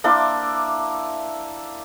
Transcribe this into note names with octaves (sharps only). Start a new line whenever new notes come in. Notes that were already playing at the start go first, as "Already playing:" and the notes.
A#3 D4 E4 C6